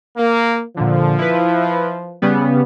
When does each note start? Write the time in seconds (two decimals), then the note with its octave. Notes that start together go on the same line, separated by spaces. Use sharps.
0.17 A#3
0.77 A#2 D3 F3
1.18 E4 B4
2.22 C#3 G3 B3